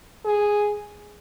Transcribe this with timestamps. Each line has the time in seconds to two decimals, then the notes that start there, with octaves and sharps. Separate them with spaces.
0.25 G#4